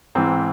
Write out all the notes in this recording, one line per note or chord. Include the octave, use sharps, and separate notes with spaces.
G#2 E3 C4